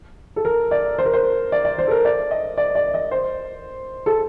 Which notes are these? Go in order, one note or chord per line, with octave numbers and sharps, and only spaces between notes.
A4
A#4
D5
C5
A#4
C5
D5
D5
C5
A4
A#4
D5
D#5
D5
D5
D#5
C5
A4